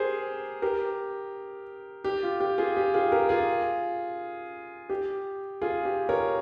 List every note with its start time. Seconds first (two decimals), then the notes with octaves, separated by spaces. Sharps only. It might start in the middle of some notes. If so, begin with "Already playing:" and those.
Already playing: G4 G#4 A#4 C5
0.62 G4 A#4
2.04 G4
2.23 F4
2.40 G4
2.58 F4 G#4
2.77 G4
2.94 F4 G#4
3.12 G4 A#4
3.29 F4 G#4
4.90 G4
5.61 F4 G#4
5.85 G4
6.09 A#4 C#5